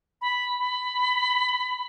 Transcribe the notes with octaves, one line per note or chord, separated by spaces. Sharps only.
B5
B5